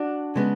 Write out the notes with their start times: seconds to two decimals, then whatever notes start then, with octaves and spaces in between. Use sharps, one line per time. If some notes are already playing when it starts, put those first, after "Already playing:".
Already playing: D4 F#4
0.36 C#3 G#3 B3